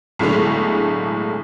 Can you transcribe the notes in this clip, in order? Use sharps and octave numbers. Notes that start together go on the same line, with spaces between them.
B1 A2 D3 G#3